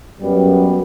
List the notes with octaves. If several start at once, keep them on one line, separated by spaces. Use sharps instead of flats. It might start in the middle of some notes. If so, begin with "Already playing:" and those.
F#2 G3 B3